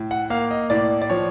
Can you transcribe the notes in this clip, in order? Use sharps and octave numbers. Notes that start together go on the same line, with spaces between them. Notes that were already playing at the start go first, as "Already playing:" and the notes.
Already playing: A2
F#5
A#3 F5
D#5
A2 D5
D5
F3 C#5